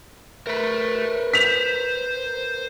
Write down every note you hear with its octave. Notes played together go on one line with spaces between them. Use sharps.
A3 A#4 B4
C5 B6 F7